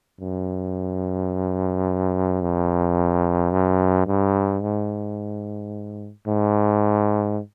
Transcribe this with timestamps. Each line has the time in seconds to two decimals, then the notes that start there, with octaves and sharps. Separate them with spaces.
0.20 F#2
2.42 F2
3.52 F#2
4.07 G2
4.62 G#2
6.28 G#2